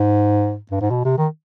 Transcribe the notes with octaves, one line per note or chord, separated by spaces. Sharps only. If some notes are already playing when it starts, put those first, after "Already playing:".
Already playing: G#2
G2
G#2
B2
C3
D#3